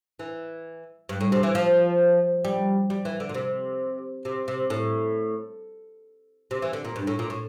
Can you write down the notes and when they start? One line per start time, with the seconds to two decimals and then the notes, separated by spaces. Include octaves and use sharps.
0.19 E3
1.09 G2
1.21 A2
1.32 C3
1.43 E3
1.55 F3
2.45 G3
2.90 G3
3.05 E3
3.20 D3
3.29 A#2
3.34 C3
4.25 C3
4.48 C3
4.70 A2
6.51 C3
6.62 E3
6.73 D3
6.85 A#2
6.96 G2
7.07 A2
7.19 A#2
7.30 A2